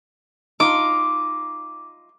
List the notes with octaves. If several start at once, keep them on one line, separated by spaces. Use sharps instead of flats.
D#4 F4 D6